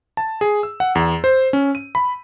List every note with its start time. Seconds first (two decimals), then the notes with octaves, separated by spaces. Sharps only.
0.17 A5
0.41 G#4
0.63 E6
0.80 F#5
0.95 E2
1.24 C5
1.53 C#4
1.75 D#7
1.95 B5